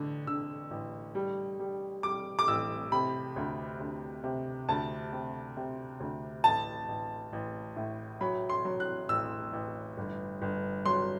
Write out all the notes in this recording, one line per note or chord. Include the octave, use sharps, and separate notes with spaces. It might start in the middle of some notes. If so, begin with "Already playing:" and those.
Already playing: A1 D3
D3 E6
A1
G3
G3
G3 D6
D6
A1 E6
C3 B5
D2
D2
C3
D2 A5
C3
C3
D2
A1 A5
A1
A1
A2
F#3 B5
C6
F#3
F#6
A1 E6
A1
G1
G1
F#3 C6